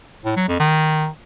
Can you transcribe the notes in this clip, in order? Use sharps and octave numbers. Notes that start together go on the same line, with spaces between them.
A2
F#3
F2
D#3